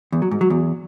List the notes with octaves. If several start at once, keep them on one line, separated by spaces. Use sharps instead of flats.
E2
F#3
G#2
F#3
E2